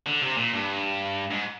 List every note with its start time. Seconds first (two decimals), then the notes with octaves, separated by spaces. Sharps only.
0.06 D3
0.22 C3
0.37 A#2
0.53 G2
1.31 G#2